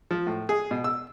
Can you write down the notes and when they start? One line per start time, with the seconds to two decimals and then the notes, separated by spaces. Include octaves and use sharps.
0.11 F3
0.27 A2
0.49 G#4
0.71 B2
0.84 E6